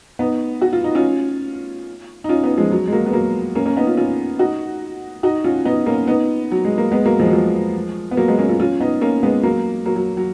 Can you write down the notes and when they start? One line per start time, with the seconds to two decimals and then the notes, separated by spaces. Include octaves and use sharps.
0.19 B3 D#4
0.61 F#4
0.73 F4
0.84 D#4
0.95 C#4 F4
2.24 D#4
2.29 C#4 F4
2.43 B3 D#4
2.57 F3 G#3
2.71 F#3
2.87 G#3
2.92 F#3 A#3
3.06 B3
3.13 F#3 A#3
3.55 A#3 C#4
3.66 A#3 C#4
3.77 B3 D#4
3.87 C#4 F4
3.97 C#4 F4
4.39 D#4 F#4
5.23 D#4 F#4
5.44 C#4 F4
5.65 B3 D#4
5.86 A#3 C#4
6.07 B3 D#4
6.52 F#3
6.65 G#3
6.78 A#3
6.92 G#3 B3
7.06 F#3 A#3
7.20 F3 G#3
7.28 F#3
7.33 F3 G#3
8.11 B3
8.17 F#3 A#3
8.28 G#3 B3
8.38 A#3 C#4
8.49 C#4 F4
8.60 C#4 F4
8.80 B3 D#4
9.01 A#3 C#4
9.23 G#3 B3
9.43 F#3 A#3
9.86 F#3 A#3
9.96 F#3
10.17 F#3